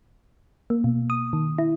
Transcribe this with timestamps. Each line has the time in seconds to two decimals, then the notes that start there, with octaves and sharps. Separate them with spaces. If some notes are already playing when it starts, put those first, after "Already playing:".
0.70 A#3
0.84 B2
1.10 D#6
1.33 D#3
1.58 E4